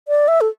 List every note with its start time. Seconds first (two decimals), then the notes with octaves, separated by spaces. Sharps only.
0.08 D5
0.28 E5
0.41 A4